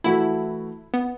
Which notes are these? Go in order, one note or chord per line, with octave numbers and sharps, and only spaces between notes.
E3 A3 E4 F#4 A4
B3